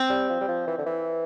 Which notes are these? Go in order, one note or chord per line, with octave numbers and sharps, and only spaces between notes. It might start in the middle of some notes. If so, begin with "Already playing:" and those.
Already playing: C4
G3
F3
G3
F3
E3
D3
E3